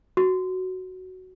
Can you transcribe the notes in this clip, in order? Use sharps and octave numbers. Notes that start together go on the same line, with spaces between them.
F#4